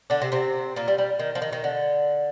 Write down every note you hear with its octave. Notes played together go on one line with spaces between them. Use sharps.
D3 D4
C3 C4
C3 C4
A#2 A#3
G3
G3
D#3
F3
D#3
D#3
D3